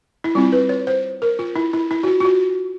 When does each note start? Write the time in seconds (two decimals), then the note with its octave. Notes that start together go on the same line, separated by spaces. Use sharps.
0.24 E4
0.35 G3 C4 E4 F4
0.52 B4
0.69 C#5
0.87 C5
1.22 A#4
1.39 F4
1.56 E4
1.73 E4
1.91 E4
2.03 F#4
2.07 F4
2.20 F4
2.25 F#4